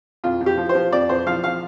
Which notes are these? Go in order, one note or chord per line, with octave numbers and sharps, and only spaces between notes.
F2 F4
F2
G4
F3
C5
F3
F2 D5
F2 C5
F3 F5
F3 F5